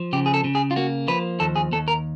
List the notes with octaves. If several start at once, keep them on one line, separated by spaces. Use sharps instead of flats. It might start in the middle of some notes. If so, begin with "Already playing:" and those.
Already playing: F3
C#3 G4
G#4
A4
C#3
G#4
F4
A#3 F#4
F3 B4
D#2 A4
G#4
D#2 A4
A#4